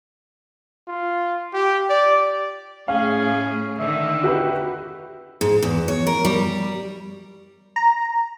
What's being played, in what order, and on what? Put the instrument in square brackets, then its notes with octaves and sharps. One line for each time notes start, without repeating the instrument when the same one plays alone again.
[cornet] F4
G4
D5
[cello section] A2 G#4 [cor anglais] C#4 [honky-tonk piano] F5
[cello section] D3 D#3 [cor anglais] E5
[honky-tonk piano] F#4 G4 B4
[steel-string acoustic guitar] G#2
E2
C#5
A#4
G3
[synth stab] A#5